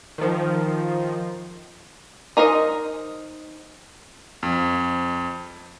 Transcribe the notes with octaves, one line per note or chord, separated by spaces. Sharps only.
D#3 F3
D#4 A#4 C5 D#5
F2